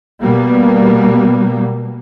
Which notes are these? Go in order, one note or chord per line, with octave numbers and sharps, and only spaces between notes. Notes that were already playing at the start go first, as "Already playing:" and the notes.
B2 G3 A#3 B3